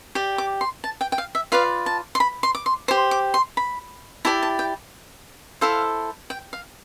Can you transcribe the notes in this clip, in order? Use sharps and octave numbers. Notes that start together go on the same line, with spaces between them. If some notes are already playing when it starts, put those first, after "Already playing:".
G4 D5
D6
C6
A5
G5
G5
F5
E5
F4 B4 D5 F5
A5
C6
B5
C6
D6
C6
G4 C5 C6
D6
C6
B5
E4 G4 D5 A5
A5
G5
E4 A4 C5 F5
G5
F5